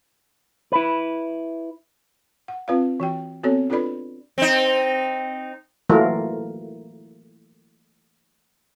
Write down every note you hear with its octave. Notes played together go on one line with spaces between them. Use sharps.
E4 B4
F#5
C4 F4 B4 D5 F5
E3 F#4 G5
B3 C4 F#4 A4 C#5
D4 F4 A4 B4 D5 B5
C4 D#4
E3 F#3 A3 A#3 F4 A#4